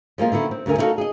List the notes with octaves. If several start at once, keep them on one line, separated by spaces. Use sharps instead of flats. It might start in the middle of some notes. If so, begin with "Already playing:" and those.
F3 G#3 A#3 F4
D3 D#3 B3 E4
C4
D2 G2 D3 A#4 G#5
D#4 E4 F#4 G#4 A4 F5
G#4 D#5